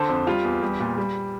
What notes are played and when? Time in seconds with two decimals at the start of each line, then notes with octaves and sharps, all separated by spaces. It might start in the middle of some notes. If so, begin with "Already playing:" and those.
Already playing: D3 A4 C5
0.09 F2
0.27 G3 F4
0.44 E2
0.62 G3
0.80 A#2
0.98 G3